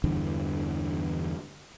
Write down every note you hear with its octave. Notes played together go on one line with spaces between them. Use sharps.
E2 G2 D3 E3